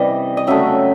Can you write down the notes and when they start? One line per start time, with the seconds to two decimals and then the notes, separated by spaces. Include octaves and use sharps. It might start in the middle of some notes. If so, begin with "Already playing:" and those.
Already playing: C3 E3 G3 D#5
0.37 D#5
0.47 C#3 F#3 A3 E5